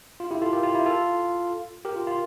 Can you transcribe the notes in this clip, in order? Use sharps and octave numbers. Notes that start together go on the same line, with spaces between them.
F4
E4 G4
F4 A4
G4 A#4
F4
E4 G4
F4 A4
G4 A#4
F4
F4